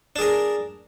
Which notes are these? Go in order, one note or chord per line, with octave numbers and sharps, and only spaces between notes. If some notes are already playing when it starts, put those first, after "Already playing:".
D4 G#4 A#4